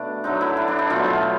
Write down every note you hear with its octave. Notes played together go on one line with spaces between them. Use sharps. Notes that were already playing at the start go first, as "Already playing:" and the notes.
Already playing: B2 A3 D4
D3 F#3 A3 D#4
E4
D4
D4
D#4
B2 F#3 A3 F4
F4